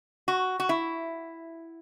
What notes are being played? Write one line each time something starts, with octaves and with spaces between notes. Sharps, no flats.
F#4
F#4
E4